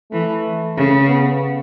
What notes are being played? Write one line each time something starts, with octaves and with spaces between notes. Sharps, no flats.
E3 A3
C#3
B3